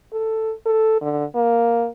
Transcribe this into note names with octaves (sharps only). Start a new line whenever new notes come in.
A4
A4
D3
A#3